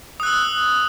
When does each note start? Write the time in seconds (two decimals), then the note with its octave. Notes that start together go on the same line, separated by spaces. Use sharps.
0.20 D#6
0.23 F#6
0.26 E6